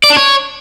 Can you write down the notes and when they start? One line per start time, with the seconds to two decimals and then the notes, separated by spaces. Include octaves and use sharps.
0.04 D5
0.10 D4
0.17 C#5